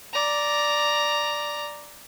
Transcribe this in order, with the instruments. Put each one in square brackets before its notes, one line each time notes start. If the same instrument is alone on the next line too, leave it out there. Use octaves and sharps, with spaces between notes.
[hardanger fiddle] D5 A#5